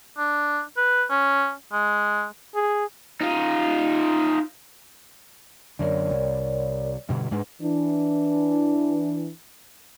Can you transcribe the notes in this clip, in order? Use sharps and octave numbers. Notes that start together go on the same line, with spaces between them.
D4
B4
C#4
G#3
G#4
D#4 F4
F#2 D3 A#4 C#5 D5
C2
G2 B2 D3
G#2 G#3 D4 B4
E3 D4